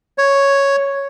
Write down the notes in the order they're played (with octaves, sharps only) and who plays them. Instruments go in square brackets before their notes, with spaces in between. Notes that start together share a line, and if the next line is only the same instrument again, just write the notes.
[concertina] C#5